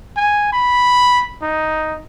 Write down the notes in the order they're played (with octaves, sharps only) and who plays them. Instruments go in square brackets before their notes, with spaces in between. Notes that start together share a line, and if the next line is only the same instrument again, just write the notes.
[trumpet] G#5
B5
D#4